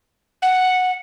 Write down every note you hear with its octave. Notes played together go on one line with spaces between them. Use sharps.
F#5